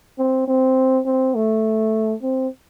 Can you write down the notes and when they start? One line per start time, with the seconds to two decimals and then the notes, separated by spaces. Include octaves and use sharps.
0.19 C4
0.48 C4
1.06 C4
1.35 A3
2.23 C4